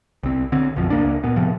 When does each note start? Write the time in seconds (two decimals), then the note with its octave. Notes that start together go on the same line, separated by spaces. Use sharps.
0.23 C2 C4
0.52 D3 C4
0.76 B1 F#2 F3
0.90 C#2 A#3 D4
1.24 A#2 B3
1.36 A2 C3 F3